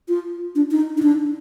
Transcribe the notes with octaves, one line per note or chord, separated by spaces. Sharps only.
F4
D4
D#4
D#4
D4